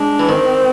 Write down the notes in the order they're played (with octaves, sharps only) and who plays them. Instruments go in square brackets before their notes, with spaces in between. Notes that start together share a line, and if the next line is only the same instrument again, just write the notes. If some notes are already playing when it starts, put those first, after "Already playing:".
Already playing: [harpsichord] G#3 [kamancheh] D4
[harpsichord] E3
[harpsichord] D#3 [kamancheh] C4